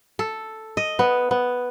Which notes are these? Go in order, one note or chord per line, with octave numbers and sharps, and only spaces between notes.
A4
D#5
B3
B3